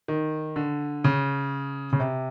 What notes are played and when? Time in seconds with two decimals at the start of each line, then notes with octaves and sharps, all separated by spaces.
0.08 D#3
0.56 D3
1.04 C#3
1.93 C#3
2.00 C3